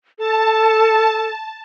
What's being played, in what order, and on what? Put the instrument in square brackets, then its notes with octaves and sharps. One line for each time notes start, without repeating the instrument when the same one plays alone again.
[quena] A4 [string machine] A5